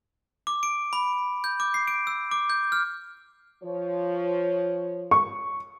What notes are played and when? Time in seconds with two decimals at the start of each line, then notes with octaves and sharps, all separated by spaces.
0.47 D6
0.63 D7
0.93 B5
1.44 G6
1.60 D6
1.74 C7
1.88 D7
2.07 E6
2.31 D6
2.50 G6
2.72 F6
3.63 F3 C#5
5.11 C#6